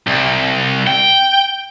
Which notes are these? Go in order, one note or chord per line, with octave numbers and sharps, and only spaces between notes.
C2
G5